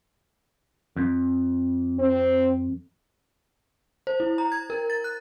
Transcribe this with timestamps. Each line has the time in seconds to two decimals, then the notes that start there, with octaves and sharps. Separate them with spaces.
0.96 F2
1.99 C4
4.07 C5
4.20 E4
4.38 A#5
4.52 G#6
4.70 A#4
4.90 A6
5.04 F#6